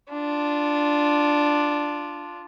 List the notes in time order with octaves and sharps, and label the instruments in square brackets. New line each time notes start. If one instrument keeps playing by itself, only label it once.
[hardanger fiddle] D4 F4